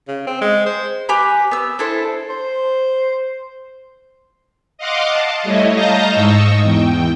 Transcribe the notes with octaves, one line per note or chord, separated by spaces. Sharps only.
C#3
C4
G#3
C5
G4 B4 G#5 B5
B3 E6
D4 E4 A4 C5
C5
D#5 F5 F#5 C6 D6
A5
G3 A3 E4 C#5 D#5
D#5 F5 A5 A#5 G6 A#6
G#2 D#5 C#6 E6
E2 G5